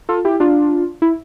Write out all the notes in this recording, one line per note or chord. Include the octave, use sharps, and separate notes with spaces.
F4 A4
E4 G4
D4 F4
E4